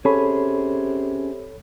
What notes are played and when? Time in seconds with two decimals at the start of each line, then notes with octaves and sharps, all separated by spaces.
0.05 C3 C#4 G#4 A4 C#5 B5